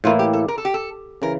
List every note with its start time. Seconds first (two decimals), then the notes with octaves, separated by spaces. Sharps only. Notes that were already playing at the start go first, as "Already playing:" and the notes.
0.04 A2 E3 A#3 E4 F4
0.19 G4
0.33 A4
0.48 A#4
0.58 A4
0.65 G4
0.74 A4
1.22 C#3 E3 A#4